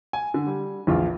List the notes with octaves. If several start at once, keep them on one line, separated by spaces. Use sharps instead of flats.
G#5
D3
G3
A#1 E2 F4